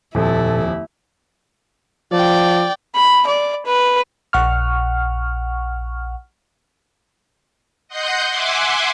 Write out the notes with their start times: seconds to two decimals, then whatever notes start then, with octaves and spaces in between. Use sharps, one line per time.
0.15 D#1 F2 A#2 E4 A4
2.12 F3 D5 G5
2.96 B5
3.27 D5
3.66 B4
4.33 A#1 F#5 C#6 F6
7.88 D#5 F#5 C6 G6
8.28 E5 F#5 G#5 C6 D6